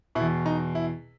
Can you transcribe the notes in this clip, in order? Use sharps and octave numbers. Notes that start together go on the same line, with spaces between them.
B2 E4
E2
D#4
E4